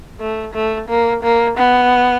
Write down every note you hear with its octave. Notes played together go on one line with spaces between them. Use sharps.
A3
A3
A#3
A#3
B3